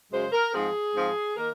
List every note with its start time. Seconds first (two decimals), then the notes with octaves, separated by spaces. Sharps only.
0.11 F#2 C#3 G#3 C5
0.32 A#4
0.53 G#2 F3 C4 G#4
0.94 G#2 F3 C4
1.35 D#3 A#3 A#4